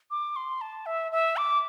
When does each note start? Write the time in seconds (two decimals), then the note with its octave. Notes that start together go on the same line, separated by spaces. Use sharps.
0.11 D6
0.36 C6
0.61 A5
0.86 E5
1.12 E5
1.37 D6